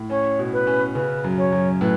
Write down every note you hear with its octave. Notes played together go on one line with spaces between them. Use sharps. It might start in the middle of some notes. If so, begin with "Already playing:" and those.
Already playing: A2
C#4 C#5
B2
B4
C#4
C#3 B4
F#2
C#5
F#2
A2 B4